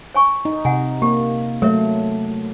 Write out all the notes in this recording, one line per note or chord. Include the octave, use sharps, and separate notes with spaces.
C#5 G#5 C#6
D#4
C3 F#5 G#5
A#3 G4
F#3 A3 A#4 C#5 E5